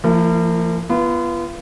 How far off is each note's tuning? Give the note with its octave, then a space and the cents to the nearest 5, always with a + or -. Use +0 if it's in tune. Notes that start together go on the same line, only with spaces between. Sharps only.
F3 -35 A#3 -35 E4 +15
B3 -10 F4 -35